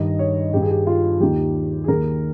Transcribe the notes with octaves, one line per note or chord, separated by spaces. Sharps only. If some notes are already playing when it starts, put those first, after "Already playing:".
Already playing: G2 D#3 D#5
C#5
G2 D#3 G4
G#4
G4
F4
D#2 D#3 G4
G#4
D#2 D#3 A#4